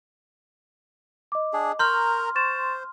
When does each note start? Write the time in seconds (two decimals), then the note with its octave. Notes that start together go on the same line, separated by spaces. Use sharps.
1.32 D#5 D6
1.53 D4 G#4
1.79 A#4 A#5 C6 C#6 F6 G6
2.35 C5 C#6 A6 E7